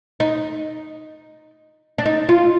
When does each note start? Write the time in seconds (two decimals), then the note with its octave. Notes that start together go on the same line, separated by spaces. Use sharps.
0.20 D#4
1.98 D4
2.05 D#4
2.29 F4